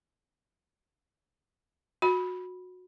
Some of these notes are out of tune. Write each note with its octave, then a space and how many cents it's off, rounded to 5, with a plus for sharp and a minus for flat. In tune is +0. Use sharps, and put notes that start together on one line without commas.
F#4 -20 B5 -10